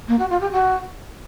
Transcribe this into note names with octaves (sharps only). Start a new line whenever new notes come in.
A#3
F#4
F4
G4
F#4